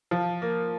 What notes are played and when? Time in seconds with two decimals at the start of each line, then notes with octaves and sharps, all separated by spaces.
0.11 F3
0.42 A#3